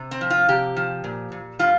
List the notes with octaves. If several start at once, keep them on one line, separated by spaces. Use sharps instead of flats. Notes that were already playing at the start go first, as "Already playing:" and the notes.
Already playing: C3
C4
F3
F4
C3 G4
F3
A#2
A#2
G3 F4